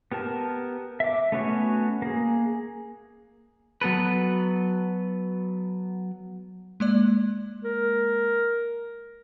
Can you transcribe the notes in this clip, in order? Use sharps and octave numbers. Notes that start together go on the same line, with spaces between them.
B3 G4 A#4 A5
E5 D6
A3 B3 C#4 F#4 C#5
A#3 G#4
F#3 B3 A4 B4
G#3 A#3 D5
A#4